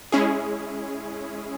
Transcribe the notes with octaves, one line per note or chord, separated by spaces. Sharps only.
G#3 C#4 E4 G#4